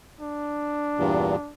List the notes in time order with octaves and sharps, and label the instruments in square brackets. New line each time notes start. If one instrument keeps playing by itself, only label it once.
[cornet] D4
[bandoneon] E2 G2 A#2